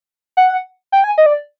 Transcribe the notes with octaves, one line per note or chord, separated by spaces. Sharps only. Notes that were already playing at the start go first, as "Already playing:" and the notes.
F#5
G5
G#5
D#5
D5